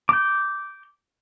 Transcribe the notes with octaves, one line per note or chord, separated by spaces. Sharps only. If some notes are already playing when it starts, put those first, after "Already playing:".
D6 G6